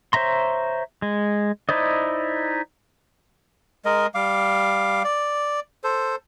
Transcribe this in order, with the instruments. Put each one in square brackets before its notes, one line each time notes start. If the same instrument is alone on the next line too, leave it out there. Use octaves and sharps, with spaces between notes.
[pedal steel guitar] C5 C#5 E5 A#5 C6
G#3
D#4 E4 C5 D5 D#5
[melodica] G#3 A#4 D#5
G3 F5 D6
D5
A4 C5